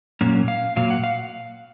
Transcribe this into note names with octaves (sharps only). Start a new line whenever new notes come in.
A#2 F#3 A#3 C#4
F5
A#2 F#3 A#3 F5
F#5
F5